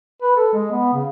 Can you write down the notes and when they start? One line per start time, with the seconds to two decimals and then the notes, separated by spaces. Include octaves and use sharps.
0.22 B4
0.37 A4
0.54 G#3
0.72 B3
0.94 C#3